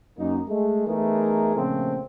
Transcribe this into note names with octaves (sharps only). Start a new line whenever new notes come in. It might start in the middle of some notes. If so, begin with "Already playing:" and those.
F#2 A#3 D#4
G#3 A3
E3 A3 B3 D#4 G#4 A#4
A#2 C#3 F3 A3 C4